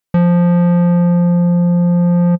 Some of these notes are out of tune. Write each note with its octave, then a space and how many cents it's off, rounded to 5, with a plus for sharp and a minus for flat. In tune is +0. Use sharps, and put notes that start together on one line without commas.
F3 +0